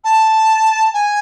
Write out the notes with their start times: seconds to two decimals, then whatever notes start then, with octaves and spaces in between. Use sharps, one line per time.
0.04 A5
0.94 G#5